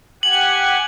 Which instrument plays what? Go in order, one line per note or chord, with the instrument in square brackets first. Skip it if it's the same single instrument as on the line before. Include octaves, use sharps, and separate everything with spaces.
[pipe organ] G4 F#5 G#5 [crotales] F#7